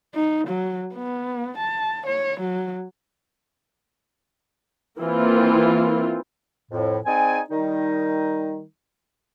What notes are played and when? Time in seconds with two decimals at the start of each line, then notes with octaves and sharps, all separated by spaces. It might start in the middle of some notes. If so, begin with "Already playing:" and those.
0.15 D#4
0.48 F#3
0.95 B3
1.58 A5
2.07 C#5
2.41 F#3
4.98 E3 A#3 C4 E4 F4
6.72 F2 A2
7.06 C4 D#4 G#4 D5 G#5
7.50 D#3 G3 D#4